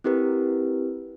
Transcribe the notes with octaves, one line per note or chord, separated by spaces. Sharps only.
C4 E4 G4 A#4 B4